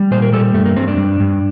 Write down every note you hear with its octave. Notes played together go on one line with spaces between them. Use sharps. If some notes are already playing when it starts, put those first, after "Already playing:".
Already playing: G3
A#2 C5
A#4
G3 A4
G2 A3
A#3
G2 C4
D4
G2
G2